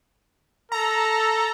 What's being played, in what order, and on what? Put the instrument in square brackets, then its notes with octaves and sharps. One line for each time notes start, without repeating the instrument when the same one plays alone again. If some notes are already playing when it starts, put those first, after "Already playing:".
[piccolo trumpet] A4 [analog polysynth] A#5